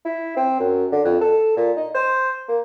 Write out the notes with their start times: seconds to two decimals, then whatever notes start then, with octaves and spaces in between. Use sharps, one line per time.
0.05 E4
0.36 C4
0.59 F#2
0.92 D3
1.04 F2
1.21 A4
1.57 A#2
1.76 D#4
1.94 C5
2.49 A#3